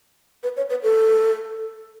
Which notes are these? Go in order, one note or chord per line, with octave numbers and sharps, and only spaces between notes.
B4
C#5
B4
A4